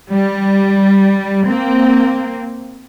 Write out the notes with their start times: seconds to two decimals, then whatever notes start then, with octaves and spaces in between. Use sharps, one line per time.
0.11 G3
1.46 A#3 C4